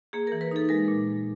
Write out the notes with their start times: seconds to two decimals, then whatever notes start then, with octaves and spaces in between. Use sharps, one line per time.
0.13 A#3 G#4
0.27 A#4
0.32 E3
0.41 B4
0.51 D#4 A4
0.69 G#3 A#4
0.88 A#2